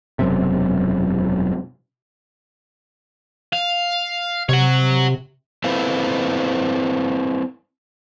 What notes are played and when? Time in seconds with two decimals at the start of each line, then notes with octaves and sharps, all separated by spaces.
0.19 E1 F#2 C3
3.53 F5
4.49 C3 C#5 F#5
5.64 C4 E4 A4 B4 C5 F5